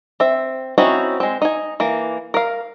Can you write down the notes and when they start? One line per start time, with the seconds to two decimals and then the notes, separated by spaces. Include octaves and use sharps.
0.20 C4 E5
0.78 C4 C#4 D#4 E4 F#4
1.20 G#3 C4
1.42 D#4 G#5
1.80 E3 A#3
2.34 A#4 F5